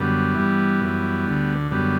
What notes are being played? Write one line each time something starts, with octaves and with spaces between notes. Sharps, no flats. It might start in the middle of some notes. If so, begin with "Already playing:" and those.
Already playing: F#2 D3 G3 B3
G2 E3
F#2 E3
D2 D3
F#2 D3 G3 B3